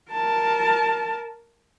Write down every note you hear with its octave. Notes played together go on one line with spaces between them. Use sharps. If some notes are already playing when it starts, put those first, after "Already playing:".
A#4 A5